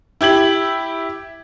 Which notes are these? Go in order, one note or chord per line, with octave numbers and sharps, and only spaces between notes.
E4 G4 G#6 F#7